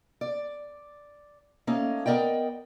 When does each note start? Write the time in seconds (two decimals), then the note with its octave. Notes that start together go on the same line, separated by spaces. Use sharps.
0.21 D5
1.67 A3 A#3 C#4 D#4
2.06 B3 A#4 D5 D#5 G5